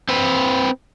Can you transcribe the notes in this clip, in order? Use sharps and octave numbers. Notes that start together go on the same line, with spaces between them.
C4 B4